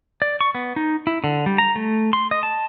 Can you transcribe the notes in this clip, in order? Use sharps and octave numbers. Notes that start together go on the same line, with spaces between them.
D5
C#6
B3
D#4
E4
D3
G3
A#5
A3
C6
D#5
A5